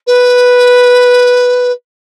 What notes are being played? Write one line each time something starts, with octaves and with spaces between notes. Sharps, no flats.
B4